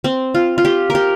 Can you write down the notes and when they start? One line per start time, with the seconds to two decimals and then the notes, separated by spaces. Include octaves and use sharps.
0.04 C4
0.35 F4
0.58 F4
0.65 G4
0.90 A#4
0.95 G4